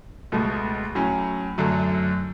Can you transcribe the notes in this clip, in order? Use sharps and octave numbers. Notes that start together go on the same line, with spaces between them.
C#2 B2 A3
A2 F#3 C#4
F#2 D3 F#3 A3